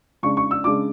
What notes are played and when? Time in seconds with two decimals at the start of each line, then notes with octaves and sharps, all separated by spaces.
0.23 C#3 G#3 D4 C#6
0.37 C#6
0.51 E6
0.64 C#3 G#3 D4 D6